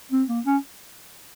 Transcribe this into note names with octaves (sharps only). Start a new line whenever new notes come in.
C4
A#3
C#4